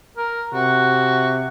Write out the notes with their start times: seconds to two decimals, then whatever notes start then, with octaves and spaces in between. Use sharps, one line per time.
0.17 A#4
0.54 C3 F#4